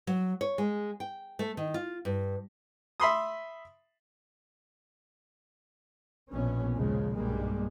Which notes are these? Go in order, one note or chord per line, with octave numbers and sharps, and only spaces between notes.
F#3
C#5
G#3
G5
A3
D#3
F4
G2
E5 B5 C6 D#6
A#1 B2 B3 C#4
D#2 C#3 F3 G#3
B1 G2 G3 G#3 A#3